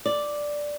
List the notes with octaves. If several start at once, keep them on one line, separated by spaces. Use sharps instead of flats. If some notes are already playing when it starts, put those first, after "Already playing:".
D5